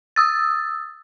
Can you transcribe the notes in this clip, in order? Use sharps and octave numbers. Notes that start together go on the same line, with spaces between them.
D#6 E6 A6